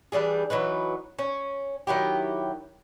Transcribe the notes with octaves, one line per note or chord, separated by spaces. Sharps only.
E3 G3 D4 G#4
E3 F#3 D#4 B4
C#4
D#3 F#3 E4 G4